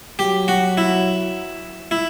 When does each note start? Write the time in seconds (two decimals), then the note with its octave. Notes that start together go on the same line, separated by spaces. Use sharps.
0.19 F#3 G4
0.48 F#4
0.78 E4
1.91 E4